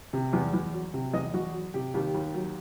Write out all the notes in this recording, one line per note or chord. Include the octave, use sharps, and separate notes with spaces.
C3
E2
E2
F#3
C3
E2 D#5
E2 F#4
F#3
C3 G4
D#2 G4
D#2
F#3